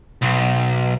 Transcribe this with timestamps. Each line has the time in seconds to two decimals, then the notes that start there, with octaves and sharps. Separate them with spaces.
0.22 B1